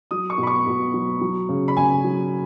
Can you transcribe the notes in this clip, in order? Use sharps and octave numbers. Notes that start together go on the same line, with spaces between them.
F#3 D#6
C#6
B2
B5
C#6
B2
F#3
F#3
C#3
B5
C#3 G#5
F#3